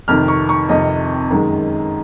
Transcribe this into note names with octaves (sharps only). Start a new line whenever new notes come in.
F2 C3 D#3 F6
C#6
C#6
F2 C3 D#3 D#5
F#2 D#3 G#3